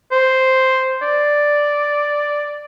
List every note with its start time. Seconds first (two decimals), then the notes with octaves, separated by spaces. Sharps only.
0.12 C5
1.02 D5